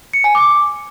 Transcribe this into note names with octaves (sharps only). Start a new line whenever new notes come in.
C#7
G#5
D6